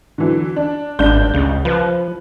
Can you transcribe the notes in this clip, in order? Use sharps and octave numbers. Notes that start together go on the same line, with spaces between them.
D3 E3 F#3
D4
G#1 G2 D4 G6
C#2 C#3
F3 B4